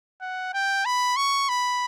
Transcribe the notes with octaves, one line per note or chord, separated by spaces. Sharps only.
F#5
G5
B5
C#6
B5